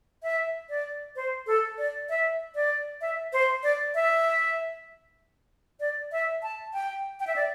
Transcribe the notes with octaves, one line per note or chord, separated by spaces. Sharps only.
E5
D5
C5
A4
D5
E5
D5
E5
C5
D5
E5
D5
E5
A5
G5
G5
E5
D5